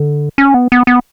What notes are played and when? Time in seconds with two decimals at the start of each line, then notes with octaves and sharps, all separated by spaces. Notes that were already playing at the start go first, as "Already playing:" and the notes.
Already playing: D3
0.38 C#4
0.54 B3
0.72 B3
0.87 B3